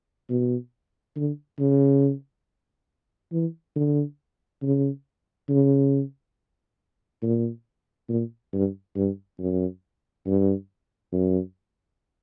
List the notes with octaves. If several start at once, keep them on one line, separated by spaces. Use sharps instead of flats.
B2
D3
C#3
E3
D3
C#3
C#3
A#2
A#2
G2
G2
F#2
G2
F#2